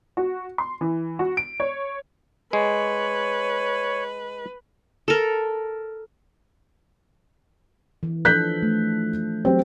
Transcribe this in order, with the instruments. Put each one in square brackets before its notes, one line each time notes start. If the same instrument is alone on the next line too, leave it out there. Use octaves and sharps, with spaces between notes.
[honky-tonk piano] F#4
C6
E3
F#4
D7
C#5
[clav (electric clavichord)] G#3 [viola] B4 [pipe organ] C#5
[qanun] A4 A#4
[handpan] E3
[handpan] F3 D4 A4 [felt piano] F#6 G6 B6
[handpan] A3
[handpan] F#3 G4 [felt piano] C4